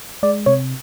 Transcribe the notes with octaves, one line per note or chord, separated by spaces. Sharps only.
G#3 D5
C3 C#5